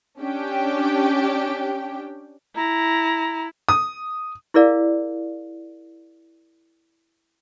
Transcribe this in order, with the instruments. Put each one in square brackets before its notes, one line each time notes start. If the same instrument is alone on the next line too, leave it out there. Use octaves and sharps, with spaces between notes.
[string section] C#4 D4 G4 G5
[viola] E4 [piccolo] A#5
[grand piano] D#6
[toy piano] E4 G#4 A#4 D5 F5